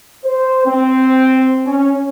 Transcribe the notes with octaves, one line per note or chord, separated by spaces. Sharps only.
C5
C4
C#4